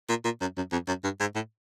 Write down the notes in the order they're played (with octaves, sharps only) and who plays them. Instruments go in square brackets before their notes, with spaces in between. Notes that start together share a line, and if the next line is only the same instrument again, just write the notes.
[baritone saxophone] A#2
A#2
F#2
F#2
F2
F#2
G2
G#2
A2